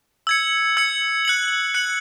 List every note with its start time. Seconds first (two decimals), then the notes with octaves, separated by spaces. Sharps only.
0.27 E6 G#6 C#7
0.77 E6 G#6 C#7
1.25 F#6 C#7 F#7
1.74 F#6 C#7 F#7